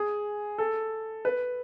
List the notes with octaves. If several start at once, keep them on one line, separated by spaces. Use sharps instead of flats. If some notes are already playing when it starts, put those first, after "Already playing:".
Already playing: G#4
A4
B4